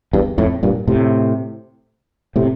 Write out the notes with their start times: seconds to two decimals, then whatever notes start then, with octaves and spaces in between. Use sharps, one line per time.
0.13 E2 G2
0.38 F2 A2
0.63 G2 A#2
0.88 A2 C3
2.36 A2 C3